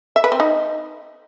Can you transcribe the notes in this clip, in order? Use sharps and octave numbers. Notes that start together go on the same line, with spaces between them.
E5
B4
C4
D#4